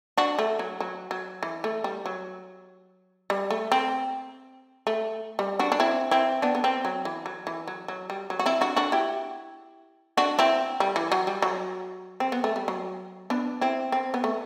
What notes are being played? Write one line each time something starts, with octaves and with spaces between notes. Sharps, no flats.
D4 F#4
A3
F#3
F#3
F#3
E3
A3
G3
F#3
G3
A3
C4
A3
G3
D4 F#4
D4
C4 E4
C4 E4
B3 D4
B3
C4
F#3
E3
F#3
E3
F#3
F#3
G3
F#3
F#4
C4 E4
D4 F#4
D4 F#4
E4 G4
D4 F#4
C4 E4
G3
E3
F#3
G3
F#3
C4
B3
A3
G3
F#3
B3 D4
C4 E4
C4
B3
A3